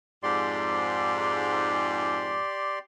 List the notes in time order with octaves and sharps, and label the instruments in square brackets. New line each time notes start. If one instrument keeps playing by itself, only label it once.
[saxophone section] F2 G#2 [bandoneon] G4 D5 C6